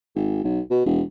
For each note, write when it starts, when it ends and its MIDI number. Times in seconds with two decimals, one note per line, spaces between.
0.15 0.42 32
0.44 0.60 35
0.71 0.85 47
0.86 1.02 28